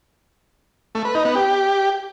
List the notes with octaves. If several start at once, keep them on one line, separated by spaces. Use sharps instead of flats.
A3
B4
D#4
B3
G4